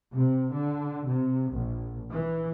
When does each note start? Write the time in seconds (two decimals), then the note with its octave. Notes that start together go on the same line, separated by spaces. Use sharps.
0.13 C3
0.53 D3
1.08 C3
1.51 A#1
2.11 E3